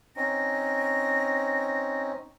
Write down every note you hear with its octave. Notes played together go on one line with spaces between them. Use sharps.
C4 C#4 D#4 A#6